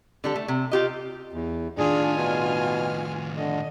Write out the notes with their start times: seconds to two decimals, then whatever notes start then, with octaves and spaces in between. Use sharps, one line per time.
0.24 D3 G3 A4
0.36 A3
0.48 C3
0.71 F4 G4 D#5
1.33 E2
1.78 A2 D#3 D4 F4 G#4 G#5
2.18 B2 F6
3.37 D3 D#5